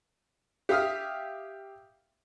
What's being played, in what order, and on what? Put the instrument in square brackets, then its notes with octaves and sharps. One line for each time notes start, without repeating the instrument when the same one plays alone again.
[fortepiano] G4 E5 F5 D#6 F6